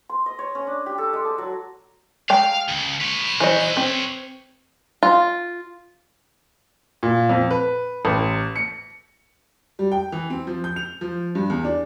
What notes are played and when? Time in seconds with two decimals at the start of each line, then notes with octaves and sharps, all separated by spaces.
0.09 C6
0.26 D#5
0.39 C#5
0.55 C#4
0.67 D4
0.86 G4
0.98 A4
1.13 G#3
1.25 A5
1.38 F#3
2.30 G#3 F5 G5 A#5
2.70 C#2
3.01 B4 C#5
3.40 E3 C5 D#5
3.77 C4
5.03 F4
7.03 A#2
7.29 F2
7.51 B4
8.05 A1
8.56 C#7
9.79 G3
9.92 G5
10.12 E3
10.30 C4
10.47 F3
10.64 G6
10.76 F7
11.01 F3
11.35 G2
11.50 E2
11.65 D4